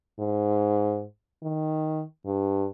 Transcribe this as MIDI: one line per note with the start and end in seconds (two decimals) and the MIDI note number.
0.19 1.04 44
1.42 2.03 51
2.26 2.67 43